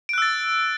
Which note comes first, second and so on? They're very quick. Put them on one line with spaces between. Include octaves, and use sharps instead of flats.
D7 F#6 E6 A6